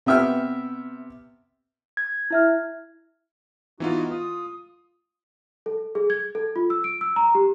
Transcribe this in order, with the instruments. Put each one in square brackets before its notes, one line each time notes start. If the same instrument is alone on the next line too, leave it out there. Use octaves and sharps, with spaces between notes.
[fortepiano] C3 B3 E5 G5 F6
[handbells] G#6
[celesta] E4 E5 F6
[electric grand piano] E3 B3 F4 [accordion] D#4 F#4
[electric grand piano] F4 [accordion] D#6
[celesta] A4
G#4
G#6
A4
F4
E6
D7
E6
A#5
G4